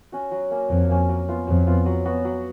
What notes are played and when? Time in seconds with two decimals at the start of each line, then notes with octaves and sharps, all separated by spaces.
0.12 C#4 F#4
0.31 F#3
0.51 A#3 C#4
0.70 F2 F#3
0.89 A#3 C#4
1.09 F#3
1.29 B3 F4
1.47 F2 F#3
1.67 B3 F4
1.86 F#3
2.06 B3 F#4
2.25 F#3